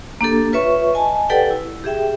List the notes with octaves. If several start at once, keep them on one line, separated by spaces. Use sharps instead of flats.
A#3 D4 G4 A4
F4 B4 C#5 E5 C#6
D#5 G#5 A5
G4 A4 B4 D5 F#5 G5
E4
G4 G#4 E5 G5